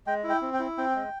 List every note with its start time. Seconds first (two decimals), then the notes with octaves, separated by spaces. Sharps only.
0.07 G#3 G5
0.24 E4
0.29 G5
0.41 C4
0.54 G5
0.59 E4
0.78 C4 G5
0.95 G#3